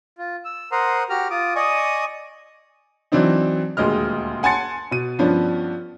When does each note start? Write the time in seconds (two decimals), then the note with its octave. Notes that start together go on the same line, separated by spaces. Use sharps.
0.18 F4
0.45 E6
0.72 A#4 C5 F#5 A#5 C6 D#6
1.10 F#4 G4 A#5 F6
1.30 F4 D6 D#6
1.55 D5 D#5 G#5 C#6 D#6
3.12 E3 F#3 C4 D4 D#4
3.77 D#1 D2 G#3 D#5 F6
4.43 F#5 G#5 A5 C6 A6 C#7
4.91 B2 D#7
5.19 G2 F3 B3 C#4 D4